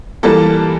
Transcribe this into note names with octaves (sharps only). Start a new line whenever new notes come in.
E3 G3 A#3 A4 A5